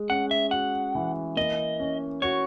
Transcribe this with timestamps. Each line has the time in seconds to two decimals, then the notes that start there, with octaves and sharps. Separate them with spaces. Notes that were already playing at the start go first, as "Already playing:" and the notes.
Already playing: G#3
0.10 C#4 F#5
0.31 E5
0.51 F#4 F#5
0.95 E3
1.36 A#3 D#5
1.80 C#4
2.22 F#4 C#5